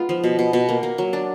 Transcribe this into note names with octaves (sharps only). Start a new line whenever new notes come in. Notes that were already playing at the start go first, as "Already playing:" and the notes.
Already playing: G#3 B3 D#4 F4
F3
B2
B2
B2
A#3
A#3
F#3
D4